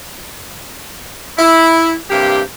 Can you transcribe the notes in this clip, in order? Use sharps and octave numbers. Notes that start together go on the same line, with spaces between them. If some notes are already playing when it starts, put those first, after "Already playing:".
E4
G2 C3 A#3 G4